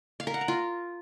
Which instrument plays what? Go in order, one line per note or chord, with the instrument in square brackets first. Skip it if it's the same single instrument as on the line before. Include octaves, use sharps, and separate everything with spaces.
[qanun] F5
A#4
F#5
A#5
F4